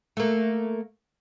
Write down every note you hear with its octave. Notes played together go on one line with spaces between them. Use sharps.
A3 A#3